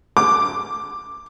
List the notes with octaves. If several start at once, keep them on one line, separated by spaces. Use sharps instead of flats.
D6